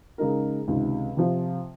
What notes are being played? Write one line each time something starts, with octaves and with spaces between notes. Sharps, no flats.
C#3 G#3 D#4 A#4
C#2 C3 D#3
C3 F3 C4 F4